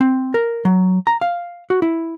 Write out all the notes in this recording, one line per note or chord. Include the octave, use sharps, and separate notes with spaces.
C4
A#4
F#3
A#5
F5
F#4
E4